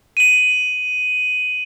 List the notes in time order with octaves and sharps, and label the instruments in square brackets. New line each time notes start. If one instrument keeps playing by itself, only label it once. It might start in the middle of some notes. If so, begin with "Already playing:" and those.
[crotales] D#7 F#7